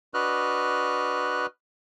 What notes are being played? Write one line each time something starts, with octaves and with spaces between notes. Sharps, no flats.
D4 F#4 B4 D#5 F6 F#6